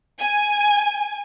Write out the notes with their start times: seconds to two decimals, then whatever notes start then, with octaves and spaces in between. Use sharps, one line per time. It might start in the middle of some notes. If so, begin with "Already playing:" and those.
0.19 G#5